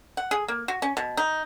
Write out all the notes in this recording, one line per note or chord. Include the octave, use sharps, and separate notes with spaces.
F#5
G#4
A#3
F#4
C#4
B2
D#4